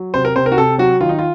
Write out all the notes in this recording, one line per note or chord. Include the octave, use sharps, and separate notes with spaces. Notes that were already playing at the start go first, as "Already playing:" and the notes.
Already playing: F#3
C3 C5
A#4
C3 C5
A#4
F#4
C3 A4
F#3 F#4
D#3 F4
D#4
F4